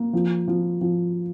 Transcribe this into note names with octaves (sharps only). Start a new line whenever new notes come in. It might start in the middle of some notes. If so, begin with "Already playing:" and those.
Already playing: A#3
F3
F3
F3